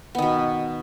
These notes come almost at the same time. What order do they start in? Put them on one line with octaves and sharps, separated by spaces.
B3 D#3 B2